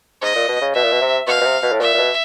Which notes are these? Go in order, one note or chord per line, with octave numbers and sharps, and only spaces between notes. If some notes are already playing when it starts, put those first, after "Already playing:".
G#2 D#5
A#2
B2
C#3
B2 E5
A#2
B2
C3
B2 F5
B2
C3
B2
A2
A#2 E5
A#2
B2